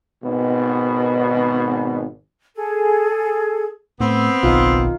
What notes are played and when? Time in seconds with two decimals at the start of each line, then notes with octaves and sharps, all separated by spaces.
0.23 G#1 B2
2.55 G#4 A4
4.00 A2 B3 C4
4.43 F#1 B1 D#3 F4